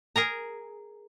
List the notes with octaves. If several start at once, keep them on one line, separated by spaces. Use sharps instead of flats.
G#4 A#4 A#5